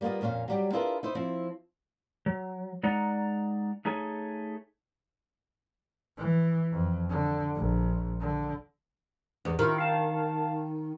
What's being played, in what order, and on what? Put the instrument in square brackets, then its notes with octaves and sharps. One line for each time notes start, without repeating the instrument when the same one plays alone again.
[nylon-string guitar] G3 A#3 B3 F4 D#5
F2 A#2 C#4 F4 F5
F#3 G3 G4
D4 E4 F4 G#4 A#4 B4
D#4 E4 C5
F3 C4 E4
[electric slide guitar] F#3
G#3 D#4 D5 F#5 A#5
A3 D#4 G#4 C#5 G#5
[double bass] E3
F2
D3
A#1
D3
[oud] E2
[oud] D#3 [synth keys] E4 F4 A#4
[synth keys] F5 A5